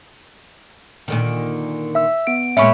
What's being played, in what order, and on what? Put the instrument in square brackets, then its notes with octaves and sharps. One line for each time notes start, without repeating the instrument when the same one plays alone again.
[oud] A#2 D3 D#3
[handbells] E5 E6
B3 D7
[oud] A#2 G#3 C#4 [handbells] E5 B5 C#6